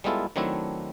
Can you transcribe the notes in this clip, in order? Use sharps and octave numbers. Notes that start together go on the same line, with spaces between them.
G3 G#3 B3 E4 F4 A4
D#3 F#3 A3 C4 D4 E4